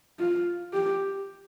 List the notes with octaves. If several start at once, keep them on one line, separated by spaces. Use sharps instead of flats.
F4
G4